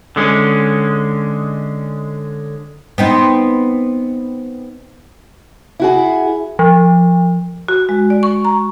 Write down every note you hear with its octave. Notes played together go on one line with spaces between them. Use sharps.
D3 G#3 C#4
B3 C4 D#4
E4 F#4 G#4
F3
F#4
G#3
D5
C#6
A#5